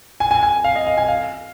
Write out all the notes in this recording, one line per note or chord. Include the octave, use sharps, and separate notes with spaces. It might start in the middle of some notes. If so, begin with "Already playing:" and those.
G#5
G#5
G#5
F5
D#5
F5
G#5
F5